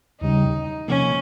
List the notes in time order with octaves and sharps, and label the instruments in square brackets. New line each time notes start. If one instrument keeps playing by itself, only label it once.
[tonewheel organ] D#2 C#3 G3 [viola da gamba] D#4
[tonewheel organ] C3 F3 A#3 [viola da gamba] C#4